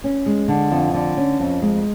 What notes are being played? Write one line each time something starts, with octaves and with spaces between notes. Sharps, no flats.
C#4
G#3
D3
F2
D3
C#4
F2
G#3